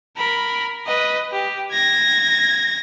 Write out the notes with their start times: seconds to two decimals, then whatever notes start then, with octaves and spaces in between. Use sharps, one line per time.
0.17 A#4 B5
0.86 B4 D#5
1.32 G4
1.72 G#6 A#6